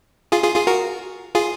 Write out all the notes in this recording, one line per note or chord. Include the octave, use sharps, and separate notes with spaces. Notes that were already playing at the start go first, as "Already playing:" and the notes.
F4 G#4
F4 G#4
F4 G#4
F#4 A#4
F4 G#4